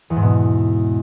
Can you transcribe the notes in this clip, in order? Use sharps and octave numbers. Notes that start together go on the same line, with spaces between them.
E2
G#2
B2